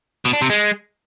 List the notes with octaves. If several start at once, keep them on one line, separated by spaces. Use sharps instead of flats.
B2
D4
C3
G#3